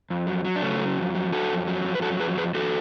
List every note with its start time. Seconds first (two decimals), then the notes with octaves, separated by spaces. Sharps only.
0.10 F2
0.27 F#3
0.45 F#3
0.56 D4
0.62 C#3 A3 C#4
0.79 F#3
0.97 F2
1.15 F#3
1.32 F#3 F#4 A4
1.50 F2
1.67 F#3
1.85 F2
1.95 B4
2.02 F#3 F#4 A4
2.20 F2 G#4 B4
2.37 F2 G#4 B4
2.54 F2 F#4 A4